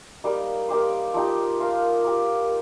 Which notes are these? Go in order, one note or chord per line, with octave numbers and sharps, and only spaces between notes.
G3 A#3 D#4
A#3 D#4 G4 C5
F3 D#4 G4
A#3 F4 A#4 F5
A#3 G4 A#4